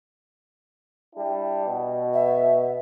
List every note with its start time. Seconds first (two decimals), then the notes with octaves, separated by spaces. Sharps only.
1.15 G3 D4 E4
1.67 B2
2.14 E5